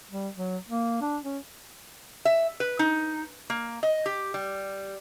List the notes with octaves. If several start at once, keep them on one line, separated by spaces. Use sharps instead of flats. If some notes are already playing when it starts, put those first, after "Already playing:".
G3
F#3
A#3
D4
C#4
E5
B4
D#4
A#3
D#5
G4
G3